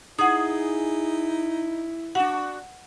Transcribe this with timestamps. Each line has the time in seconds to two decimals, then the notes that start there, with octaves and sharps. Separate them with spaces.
0.19 D#4 E4 G#4 F#5 D#6
2.15 D4 F#4 F#5